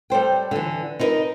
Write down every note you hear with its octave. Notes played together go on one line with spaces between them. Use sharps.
G3 A4 C5 G5
D3 E3
D#4 E4 A#4 B4 D#5